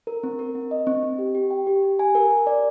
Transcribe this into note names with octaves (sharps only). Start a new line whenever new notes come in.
A#4
C4
A#4
C4
D#5
C4
C4
G4
G4
G5
G4
G4
G#5
A#4
A#4
D5